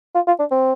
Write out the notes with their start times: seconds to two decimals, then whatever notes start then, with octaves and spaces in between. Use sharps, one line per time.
0.15 F4
0.27 F4
0.39 D4
0.51 C4